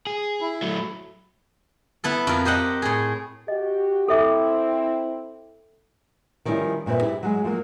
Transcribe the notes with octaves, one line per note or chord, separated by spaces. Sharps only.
G#4
E4
F#3 A3
B3 E4 A4
F2 A#4
G4 C5 D#5 F#5
A2 G#4
F#4 G4 D#5
C4 E4 A4 E5 D6
D#3 F3 G3 C#4 E4
G2 A#2 C4 B4 E5
E4 G4
F#3 G#3
F3 F#3 A#3